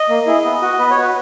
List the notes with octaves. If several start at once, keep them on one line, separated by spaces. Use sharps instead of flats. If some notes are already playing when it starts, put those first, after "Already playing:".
Already playing: D#5
A#3
E4 G#4
B3
F#4
B3 B4
C#5
F#4
B4